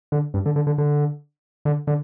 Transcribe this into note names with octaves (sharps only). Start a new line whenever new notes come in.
D3
G2
D3
D3
D3
D3
D3
D3